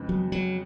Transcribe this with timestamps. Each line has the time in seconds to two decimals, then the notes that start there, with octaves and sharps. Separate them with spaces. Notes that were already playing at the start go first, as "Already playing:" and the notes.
Already playing: F2 C#3 G#3 B3
0.09 F#3
0.32 F#3